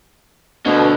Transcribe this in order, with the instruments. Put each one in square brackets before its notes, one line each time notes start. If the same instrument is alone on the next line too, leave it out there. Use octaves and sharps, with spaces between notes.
[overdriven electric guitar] D2 D3 [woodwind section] B2